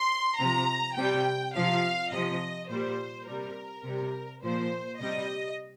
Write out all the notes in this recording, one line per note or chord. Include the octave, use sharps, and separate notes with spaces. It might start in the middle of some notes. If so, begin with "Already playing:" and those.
Already playing: C6
C3 F3 A#5
C3 G3 G5
C3 F3 F5
C3 F3 D#5
A#2 G3 C5
C3 G3 A#4
C3 G3
A#2 F3 C5
C3 G3 D#5